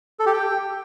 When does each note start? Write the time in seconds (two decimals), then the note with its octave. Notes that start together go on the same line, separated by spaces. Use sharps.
0.20 A4
0.26 G4
0.33 G5